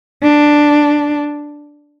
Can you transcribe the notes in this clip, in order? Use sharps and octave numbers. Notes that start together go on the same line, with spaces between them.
D4